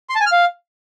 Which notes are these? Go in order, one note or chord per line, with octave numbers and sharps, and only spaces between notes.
C6
A5
G#5
F6
F5